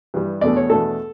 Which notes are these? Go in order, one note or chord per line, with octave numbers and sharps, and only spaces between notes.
G2 E3 G3
E2 B2 A3 D4 D5
C#5
E2 B2 A3 D4 A4